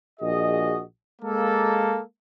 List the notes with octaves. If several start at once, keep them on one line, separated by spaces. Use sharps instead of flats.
A#1 F#4 G#4 D#5
G#3 A#3 A4